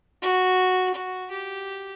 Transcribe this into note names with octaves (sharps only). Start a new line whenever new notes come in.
F#4
F#4
G4